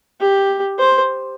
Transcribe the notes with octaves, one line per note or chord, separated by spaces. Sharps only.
G4
C5